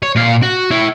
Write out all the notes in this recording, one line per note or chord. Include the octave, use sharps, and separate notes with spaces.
C#5
A#2 F5
F#4
E4 C#5